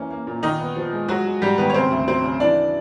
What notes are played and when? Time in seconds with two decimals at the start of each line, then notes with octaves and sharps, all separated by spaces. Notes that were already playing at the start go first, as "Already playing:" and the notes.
Already playing: E3 A#3 C#4
0.11 A#3
0.27 A#2
0.43 A#2 D#3 D#4
0.60 B3
0.76 F3
0.93 G#3
1.08 F#3 G#3 F#4
1.26 G#3
1.42 G#2 G3 G4
1.58 D#3 B3 B4
1.70 C#5
1.74 C#3 C4 C5
1.91 D2
2.07 F#3 C4 C5
2.24 C#3
2.40 E3 D4 D5